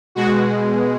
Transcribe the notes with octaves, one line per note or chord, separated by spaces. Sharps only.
B2 G#3 F#4